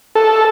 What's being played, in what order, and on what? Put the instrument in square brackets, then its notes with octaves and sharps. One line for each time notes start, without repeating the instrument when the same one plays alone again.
[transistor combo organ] A4